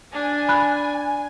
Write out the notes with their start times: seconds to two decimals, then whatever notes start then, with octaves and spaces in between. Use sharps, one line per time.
0.13 D4 G#5
0.49 B5 F#6